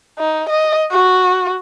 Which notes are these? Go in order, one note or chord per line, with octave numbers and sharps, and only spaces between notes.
D#4
D#5
F#4